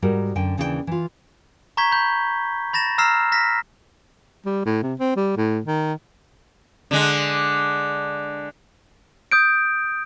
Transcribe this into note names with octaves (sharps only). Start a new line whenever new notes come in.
G#2 G3 F#4 A#4
F#2 D3 G5 G#5
D#2 C#3 E3 D4 F#4 G5
E3 F4
A#5 C#6 G6 G#6 B6 G7
B5 G6
B5 A6 A#6 E7
A#5 E6 F6 A#6 C7 E7
F6 A#6 B6
G3
A2
C3
C4
G3
A2
D#3
D3 G#3
D#6 G6 D7